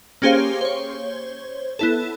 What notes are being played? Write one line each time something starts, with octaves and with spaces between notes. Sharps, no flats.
A#3 C#4 G4 G#4 C5 F5
C5 C#5
B3 E4 A4